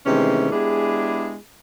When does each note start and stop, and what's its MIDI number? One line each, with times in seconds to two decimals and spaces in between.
0.06 0.51 48
0.06 0.51 51
0.06 0.51 52
0.06 0.51 56
0.06 0.51 57
0.06 0.51 61
0.51 1.35 56
0.51 1.35 59
0.51 1.35 62
0.51 1.35 64
0.51 1.35 67
0.51 1.35 68